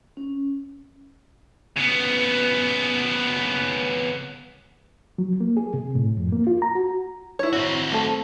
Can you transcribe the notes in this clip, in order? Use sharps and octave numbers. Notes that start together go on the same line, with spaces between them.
C#4
C#3 B3
F#3
A#3
G#4
C3
A2
F2
A#3
F4
A#5
F#4
E4 C#5
C4 F#4
A3 A4